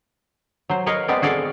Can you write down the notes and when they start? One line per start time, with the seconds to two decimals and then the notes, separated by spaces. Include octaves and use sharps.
0.69 F#3 C5
0.86 A#4 B4 C#5 D#5 F5
1.08 G#3 B3 C4 D5
1.22 F#4 G#4 A4 D5 F5